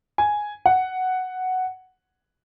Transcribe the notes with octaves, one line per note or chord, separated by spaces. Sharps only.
G#5
F#5